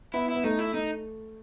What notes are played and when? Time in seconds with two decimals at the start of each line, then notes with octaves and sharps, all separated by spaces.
0.14 B3 E4
0.29 E4
0.35 B3
0.44 A3 D#4
0.59 E4
0.74 A3 D#4